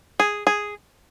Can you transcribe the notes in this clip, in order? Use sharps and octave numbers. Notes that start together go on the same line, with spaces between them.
G#4
G#4